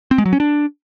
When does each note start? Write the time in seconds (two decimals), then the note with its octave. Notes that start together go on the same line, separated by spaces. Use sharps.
0.11 C4
0.18 G#3
0.25 F#3
0.33 C#4
0.40 D4